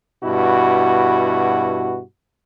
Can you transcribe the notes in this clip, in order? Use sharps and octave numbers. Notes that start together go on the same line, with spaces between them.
G2 B2 E4 F#4